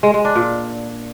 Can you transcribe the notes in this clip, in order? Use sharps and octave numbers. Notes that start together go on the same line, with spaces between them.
G#3
G#3
D4
A#2